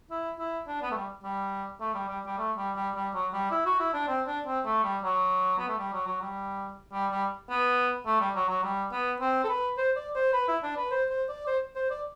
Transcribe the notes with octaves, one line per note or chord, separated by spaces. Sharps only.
E4
E4
D4
B3
A3
G3
G3
A3
G3
G3
G3
A3
G3
G3
G3
F#3
G3
E4
F#4
E4
D4
C4
D4
C4
A3
G3
F#3
B3
A3
G3
F#3
F#3
G3
G3
G3
B3
A3
G3
F#3
F#3
G3
B3
C4
A4
B4
C5
D5
C5
B4
E4
D4
B4
C5
C5
D5
C5
C5
D5